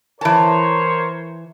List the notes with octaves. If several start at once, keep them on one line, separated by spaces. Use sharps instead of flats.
E3 A#4 C5 C#5 A5